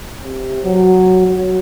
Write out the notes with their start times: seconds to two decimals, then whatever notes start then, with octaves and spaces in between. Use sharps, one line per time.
0.23 C3
0.63 F#3
1.27 F#3